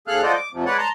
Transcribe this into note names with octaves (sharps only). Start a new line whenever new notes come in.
D#2 G#4 A4 F5 F6 F#6
F4 F#4 A4 C5 D5 D#5
D6
F2 C3 F3
G#3 B4 C#5 D5 F#5
A5 A#5 C6